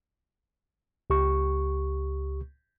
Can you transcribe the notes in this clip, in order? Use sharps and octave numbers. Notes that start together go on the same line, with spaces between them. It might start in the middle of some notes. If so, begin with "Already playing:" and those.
C#2 G4 C#6